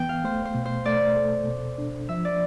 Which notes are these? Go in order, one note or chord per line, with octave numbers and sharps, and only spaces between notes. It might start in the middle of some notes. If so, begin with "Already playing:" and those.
Already playing: E3 B3 G5
F5
A3 C5
C5
B2
C5
A3 D5
A4
B2
D4
F3 E5
D5